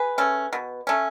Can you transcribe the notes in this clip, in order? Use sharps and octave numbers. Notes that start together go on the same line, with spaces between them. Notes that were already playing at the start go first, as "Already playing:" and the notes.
Already playing: G#4 B4
A3 C#4
B2
A3 C#4